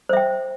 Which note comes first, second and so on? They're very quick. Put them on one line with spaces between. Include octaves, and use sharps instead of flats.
C5 E5 G5